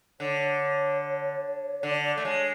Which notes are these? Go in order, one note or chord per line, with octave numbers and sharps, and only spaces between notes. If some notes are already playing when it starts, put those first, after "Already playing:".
D3 C#5
D3 D5
D5
A3
G#3 C#5